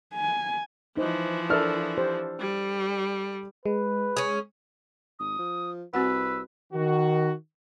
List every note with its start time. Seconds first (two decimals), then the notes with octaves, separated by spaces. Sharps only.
0.14 G#5
0.97 E3 F3 D#4 C5
1.50 D4 A4 A#4 E5 F6
1.98 G4 C5
2.40 G3
3.66 G#3 B4
4.17 C#4 G#4
5.19 G#1 D#6
5.38 F3
5.94 C2 C4 F#4 B4 F#5 E6
6.73 D#3 F#4